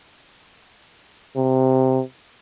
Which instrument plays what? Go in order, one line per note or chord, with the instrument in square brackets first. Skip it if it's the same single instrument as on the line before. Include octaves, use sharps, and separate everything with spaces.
[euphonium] C3